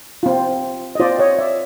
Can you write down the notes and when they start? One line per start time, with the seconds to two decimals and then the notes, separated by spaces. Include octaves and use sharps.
0.23 C4 F4
0.95 D#5
1.00 C4 F4 C5 D5
1.18 C#5 D#5
1.39 D5 E5